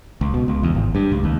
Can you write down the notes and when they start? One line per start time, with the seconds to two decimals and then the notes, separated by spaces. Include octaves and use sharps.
0.21 C#2
0.34 B2
0.48 C#2
0.63 E2
0.75 G#1
0.95 G2
1.12 C#2
1.24 D#2